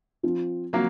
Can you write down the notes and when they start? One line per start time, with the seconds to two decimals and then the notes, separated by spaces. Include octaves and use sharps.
0.23 F3 C4 F4
0.73 F3 F#3 A#3 C4